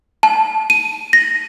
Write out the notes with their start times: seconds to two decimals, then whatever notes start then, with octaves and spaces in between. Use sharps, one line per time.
0.23 A5
0.70 D#7
1.13 A#6